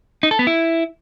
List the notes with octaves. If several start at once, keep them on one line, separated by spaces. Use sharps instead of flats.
D#4
A4
B3
E4